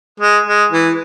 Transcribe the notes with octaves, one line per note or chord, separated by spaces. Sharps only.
G#3
G#3
E3